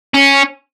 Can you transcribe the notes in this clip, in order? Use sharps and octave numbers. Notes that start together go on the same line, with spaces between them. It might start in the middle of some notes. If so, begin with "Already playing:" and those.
C#4